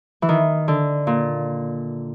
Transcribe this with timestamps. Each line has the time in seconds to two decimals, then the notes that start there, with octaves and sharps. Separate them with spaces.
0.22 E3
0.29 D#3
0.68 D3
1.07 A#2